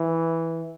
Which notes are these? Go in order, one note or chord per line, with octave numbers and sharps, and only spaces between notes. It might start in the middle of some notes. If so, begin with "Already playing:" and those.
Already playing: E3